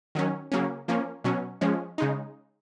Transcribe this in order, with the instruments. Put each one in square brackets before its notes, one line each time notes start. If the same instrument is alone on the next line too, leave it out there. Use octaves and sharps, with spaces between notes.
[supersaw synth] D#3 F#3 C#4
C#3 F#3 A#3 C#4
F3 A#3 C#4
B2 F#3 C#4
F3 G#3 C#4
C#3 G#3 D#4